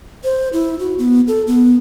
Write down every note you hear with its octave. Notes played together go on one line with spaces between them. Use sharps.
C5
E4
F#4
B3
A4
B3